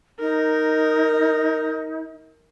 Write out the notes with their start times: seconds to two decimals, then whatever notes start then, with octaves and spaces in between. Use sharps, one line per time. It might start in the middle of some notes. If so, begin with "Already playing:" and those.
0.19 D#4 A#4